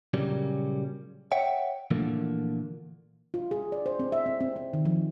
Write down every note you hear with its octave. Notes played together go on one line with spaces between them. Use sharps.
A#2 C#3 F#3 G3 A#3
C#5 E5 F#5 G5
A#2 D3 E3 F3 A3 A#3
F4
G#4
D5
C5
C4
E5
C4
C4
C4
D#3
F3